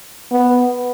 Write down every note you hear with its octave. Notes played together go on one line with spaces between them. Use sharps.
B3